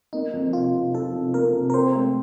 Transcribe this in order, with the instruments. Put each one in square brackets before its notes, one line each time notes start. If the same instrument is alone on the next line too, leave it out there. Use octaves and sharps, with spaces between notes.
[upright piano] A#3 [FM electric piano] D#4
[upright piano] F2
[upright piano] C3 [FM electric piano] F4
[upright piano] C3
[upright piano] F3 [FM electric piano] A4
[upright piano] C3
[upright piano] A#3 [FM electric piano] A#4
[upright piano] C3
[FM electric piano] A#4
[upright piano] C4 [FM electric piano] C5
[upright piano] A3